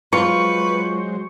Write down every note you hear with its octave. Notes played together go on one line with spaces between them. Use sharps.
F#3 G#3 F4 B4 C5 C#6